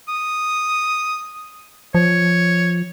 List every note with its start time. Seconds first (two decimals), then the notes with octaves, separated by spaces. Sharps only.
0.08 D#6
1.95 F3 C#5